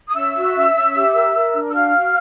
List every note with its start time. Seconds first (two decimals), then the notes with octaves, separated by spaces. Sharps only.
0.08 D#6
0.15 C#4 E5 E6
0.35 F#4
0.55 C#4
0.75 C#4
0.95 G4
1.15 A#4
1.34 A#4
1.54 D4
1.69 E6
1.74 F#4 F5 F6
1.94 F#4